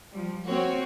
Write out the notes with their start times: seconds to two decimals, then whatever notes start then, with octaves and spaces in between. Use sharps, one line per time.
0.11 F3 G3
0.45 A#3 C4 F#4 C#5